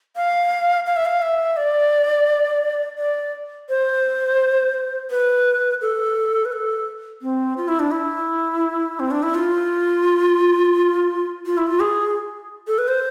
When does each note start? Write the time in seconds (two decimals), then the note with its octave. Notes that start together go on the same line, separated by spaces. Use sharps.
0.16 F5
0.86 F5
0.96 E5
1.05 F5
1.22 E5
1.57 D5
2.98 D5
3.69 C5
5.11 B4
5.81 A4
6.45 B4
6.52 A4
7.22 C4
7.57 F4
7.68 E4
7.80 D4
7.91 E4
9.00 C4
9.11 D4
9.23 E4
9.35 F4
11.46 F4
11.58 E4
11.67 F4
11.81 G#4
12.67 A4
12.78 B4
12.88 C5